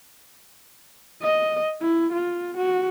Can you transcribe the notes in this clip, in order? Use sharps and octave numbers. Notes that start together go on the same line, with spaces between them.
D#5
E4
F4
F#4